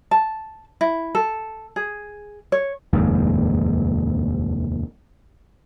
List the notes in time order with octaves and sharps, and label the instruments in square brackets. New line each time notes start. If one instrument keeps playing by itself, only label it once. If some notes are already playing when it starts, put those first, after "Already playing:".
[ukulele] A5
E4
A4
G#4
C#5
[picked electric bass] F1 D#2 G#2